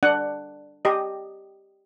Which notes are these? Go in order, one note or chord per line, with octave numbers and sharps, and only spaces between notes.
D4 F#5
G4 D#5